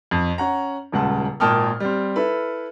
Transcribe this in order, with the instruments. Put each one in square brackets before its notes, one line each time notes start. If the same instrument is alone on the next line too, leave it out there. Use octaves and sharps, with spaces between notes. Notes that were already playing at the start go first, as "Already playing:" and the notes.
[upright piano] F2
C#4 F#5 A#5
D#1 C#2 C#3 F#5 A5
G#1 A#2 G5 A5 D#6 F6
G3 C4
E4 A4 B4